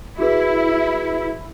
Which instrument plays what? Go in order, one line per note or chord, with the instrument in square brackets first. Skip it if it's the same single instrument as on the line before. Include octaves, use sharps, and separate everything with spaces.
[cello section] E4 [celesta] F#4 G#4 B4